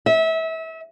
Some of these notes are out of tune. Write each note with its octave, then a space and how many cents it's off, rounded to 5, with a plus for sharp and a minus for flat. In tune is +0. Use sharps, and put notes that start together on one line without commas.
E5 -30